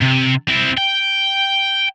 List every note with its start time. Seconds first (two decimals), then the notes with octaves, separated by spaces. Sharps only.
0.02 C3
0.49 C4 E4
0.77 G5